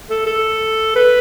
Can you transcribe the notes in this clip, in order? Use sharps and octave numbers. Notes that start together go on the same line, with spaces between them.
A4
A4
B4